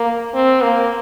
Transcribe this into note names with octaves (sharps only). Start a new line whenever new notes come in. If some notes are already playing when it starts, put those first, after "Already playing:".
Already playing: A#3
C4
A#3